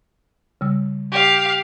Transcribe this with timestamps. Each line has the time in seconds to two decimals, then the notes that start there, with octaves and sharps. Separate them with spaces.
0.61 C#3 G3 E6
1.12 G4 F5